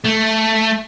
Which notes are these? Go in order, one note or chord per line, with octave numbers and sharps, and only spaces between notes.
A3